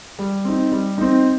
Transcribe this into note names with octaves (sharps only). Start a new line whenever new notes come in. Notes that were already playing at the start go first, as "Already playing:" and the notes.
G3
C4 D#4
G3
C4 D#4